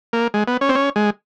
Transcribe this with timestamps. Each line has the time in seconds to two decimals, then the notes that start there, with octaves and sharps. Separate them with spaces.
0.13 A#3
0.34 G#3
0.48 B3
0.61 C#4
0.69 C4
0.75 C#4
0.96 G#3